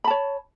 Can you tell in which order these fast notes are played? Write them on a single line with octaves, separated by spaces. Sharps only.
B5 A5 C#5